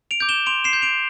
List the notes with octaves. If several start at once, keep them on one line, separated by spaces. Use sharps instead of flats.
D7 F7
D6 G6
E7 G7
C6 D7 F7
C7 E7
G6
D7 F7